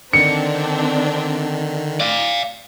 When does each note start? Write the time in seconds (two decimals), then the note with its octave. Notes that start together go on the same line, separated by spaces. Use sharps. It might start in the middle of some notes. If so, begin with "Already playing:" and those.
0.13 D3 D#3 C4 D4 C#7
2.00 D5 F5